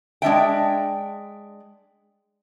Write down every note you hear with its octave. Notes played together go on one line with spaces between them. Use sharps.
G#3 D4 E5 G5